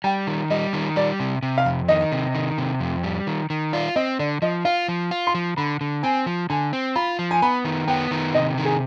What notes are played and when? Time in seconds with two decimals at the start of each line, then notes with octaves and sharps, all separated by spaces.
0.04 G3 G5
0.27 D#3
0.50 G3 D#5
0.73 D#3
0.96 G3 D5
1.20 C3
1.43 C3
1.58 F5
1.66 F2
1.88 D#3 D#5
2.12 C3
2.35 D#3
2.58 C3
2.80 F2
3.04 G3
3.27 D#3
3.50 D#3
3.73 F4 D5
3.96 C4 D#5
4.19 D3 D5
4.42 F3 D#5
4.65 F4 F5
4.88 F3
5.11 F4
5.27 C6
5.35 F3
5.57 D3 B5
5.81 D3
6.03 C4 G#5
6.26 F3
6.50 D3 G#5
6.73 C4
6.96 F4 B5
7.19 F3
7.31 G#5
7.42 B3 B5
7.65 D#3
7.87 B3 G5
8.11 D#3
8.35 C3 D#5
8.58 D#3
8.65 G#4